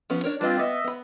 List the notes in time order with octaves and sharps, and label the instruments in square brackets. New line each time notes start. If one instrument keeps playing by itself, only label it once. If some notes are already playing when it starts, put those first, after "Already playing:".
[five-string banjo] F3 B3 C#4
D4 A#4 C#5
[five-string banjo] G3 B4 D#5 [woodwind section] C4 D4 F4
[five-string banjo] B3 [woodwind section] D#5 E5
[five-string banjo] B3 B5